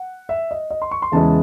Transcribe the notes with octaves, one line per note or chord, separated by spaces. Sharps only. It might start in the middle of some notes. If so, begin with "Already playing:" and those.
Already playing: F#5
E5
D#5
D#5
C6
C#6
C6
E2 C#3 E3 G#3 A5